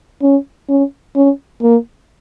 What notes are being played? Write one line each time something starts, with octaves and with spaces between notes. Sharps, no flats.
C#4
C#4
C#4
A#3